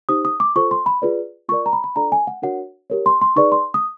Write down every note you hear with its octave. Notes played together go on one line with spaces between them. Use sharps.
D#4 G4 C5 D#6
D#6
D6
F4 A4 C5 C#6
C6
B5
F4 G#4 B4 D5
F4 A#4 D5 C#6
A#5
B5
B5
D4 F4 A4 D5 A#5
G#5
F#5
D4 F#4 A#4 C#5 F#5
G4 A#4 C#5
C6
C6
D#4 G#4 B4 D5 C#6
C6
D#6